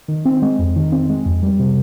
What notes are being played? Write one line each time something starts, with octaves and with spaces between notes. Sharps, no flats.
D#3
C4
G#3
F2
D#3
C4
G#3
F2
G3
C3